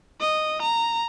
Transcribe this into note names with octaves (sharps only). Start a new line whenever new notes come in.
D#5
A#5